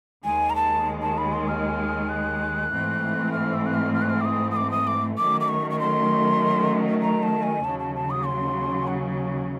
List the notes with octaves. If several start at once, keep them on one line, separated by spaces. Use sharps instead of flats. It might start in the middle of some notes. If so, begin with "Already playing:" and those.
D#2 D#3 G#3 G#5
A#5
A5
A5
B5
C6
F6
F#6
G#2 E3 A3 C4
F6
E6
F#6
F6
F6
F#6
F6
D6
D#6
D#6
D6
D#6
D6
D#3 F#3 A3 C#4 D6
D6
C#6
C#6
C6
A#5
A5
G#5
D#2 C#3 F#3 A5
A5
A5
D#6
C6
F#5